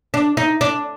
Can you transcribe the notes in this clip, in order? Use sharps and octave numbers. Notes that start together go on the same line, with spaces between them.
D4
D#4
D4